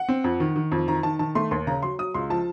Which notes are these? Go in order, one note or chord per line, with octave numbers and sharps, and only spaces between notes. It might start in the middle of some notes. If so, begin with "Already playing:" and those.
Already playing: F#5
C4
F2
D#3
D#3
F2
D#3 A#5
D#3 A5
D#3 A5
A3 C6
D#2 C6
C#3 A#5
F#3 C6
F#3 D#6
C#2 C6
F3 A5